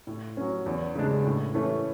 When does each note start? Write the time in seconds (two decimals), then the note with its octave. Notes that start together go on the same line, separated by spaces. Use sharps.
0.07 A2
0.37 F#3 C#4
0.66 E2
0.95 C#3 G#3 D4
1.25 A2
1.54 E3 A3 C#4